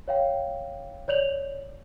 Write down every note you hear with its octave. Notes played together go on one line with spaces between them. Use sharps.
C#5 F5 G5
C#5 D5 G6 F7 F#7